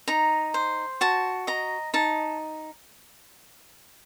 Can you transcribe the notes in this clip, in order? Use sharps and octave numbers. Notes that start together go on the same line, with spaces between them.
D#4 A#5
C5
F#4 A5
D#5 A#5
D#4 A5